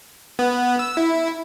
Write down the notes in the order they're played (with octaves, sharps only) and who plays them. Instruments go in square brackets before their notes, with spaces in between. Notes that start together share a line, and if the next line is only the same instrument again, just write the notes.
[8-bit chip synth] B3
E6
E4